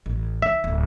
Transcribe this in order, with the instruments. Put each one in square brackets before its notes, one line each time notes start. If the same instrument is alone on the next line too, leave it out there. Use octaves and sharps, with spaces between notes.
[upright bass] A1
[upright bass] D#3 [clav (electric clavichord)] E5
[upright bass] D1